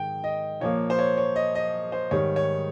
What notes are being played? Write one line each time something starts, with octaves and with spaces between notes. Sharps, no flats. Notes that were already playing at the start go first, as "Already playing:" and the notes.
Already playing: G#2 D#3 G5
D#5
A#2 F3 A#3 C#5
C5
C#5
C#5
D#5
D#5
C5
G#2 D#3 G3 C#5
C#5